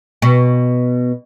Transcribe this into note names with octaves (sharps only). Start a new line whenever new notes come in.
B2